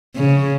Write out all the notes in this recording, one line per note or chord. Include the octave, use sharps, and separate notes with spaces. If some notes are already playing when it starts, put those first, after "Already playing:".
C#3